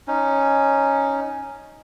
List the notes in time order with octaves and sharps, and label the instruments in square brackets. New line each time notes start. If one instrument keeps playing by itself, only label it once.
[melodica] C#4 D#4